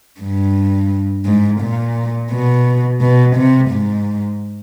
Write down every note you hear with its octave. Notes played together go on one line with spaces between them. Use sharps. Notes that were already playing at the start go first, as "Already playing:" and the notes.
G2
G#2
A#2
B2
B2
C3
G#2